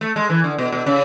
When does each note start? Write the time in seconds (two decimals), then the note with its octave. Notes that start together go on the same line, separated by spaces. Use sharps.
0.01 A3
0.16 G#3
0.30 E3
0.44 D3
0.58 B2
0.72 B2
0.86 C#3